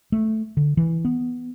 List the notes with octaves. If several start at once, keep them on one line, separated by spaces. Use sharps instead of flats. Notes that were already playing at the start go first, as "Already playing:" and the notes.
A3
D3
E3
B3